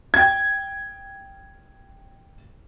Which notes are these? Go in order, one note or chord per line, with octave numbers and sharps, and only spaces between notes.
G5 G#6